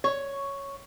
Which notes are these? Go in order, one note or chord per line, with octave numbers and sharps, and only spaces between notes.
C#5